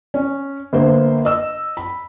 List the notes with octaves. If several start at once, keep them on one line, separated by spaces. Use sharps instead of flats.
C#4
G1 A#3 C5
D#5 E6
B5